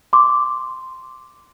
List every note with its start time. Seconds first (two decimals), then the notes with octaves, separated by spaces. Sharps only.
0.13 C6 D6